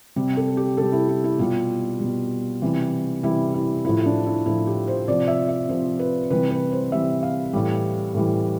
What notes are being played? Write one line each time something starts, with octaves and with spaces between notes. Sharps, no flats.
C3 G3 G4
A4
G4
C3 G3 A4
E4
E4
E4
B2 G3 F4
B2 G3
C3 E3 G3
C3 E3 G3 E4
E4
A2 F3 E4
D4
E4
A2 F3 E4
G4
C5
C3 F3 D5
E5
E5
C3 F3 C5
B4
C3 E3 G3 B4
B4
C5
C3 E3 G3 E5
F5
A2 E3 G3
A2 E3 G3